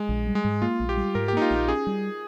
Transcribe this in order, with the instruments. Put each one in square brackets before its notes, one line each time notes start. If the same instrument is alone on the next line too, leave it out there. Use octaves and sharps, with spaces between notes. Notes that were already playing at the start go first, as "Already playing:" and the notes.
Already playing: [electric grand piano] G#3
[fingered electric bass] A#1
G3
[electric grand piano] G#3
[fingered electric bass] G#2
[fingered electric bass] A#3 [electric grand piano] F4
[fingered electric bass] A#1
[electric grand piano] G4
[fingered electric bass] G3
[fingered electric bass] G#2 [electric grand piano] A#4
[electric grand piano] G4
[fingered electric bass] A#3 [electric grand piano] D#4
[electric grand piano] F4
[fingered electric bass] A#1 [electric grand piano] G4
[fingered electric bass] C#4 [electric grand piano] G#4
[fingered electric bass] G3